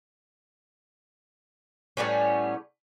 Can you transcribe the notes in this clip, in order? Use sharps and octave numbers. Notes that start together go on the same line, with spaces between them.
A2 G3 B3 C#4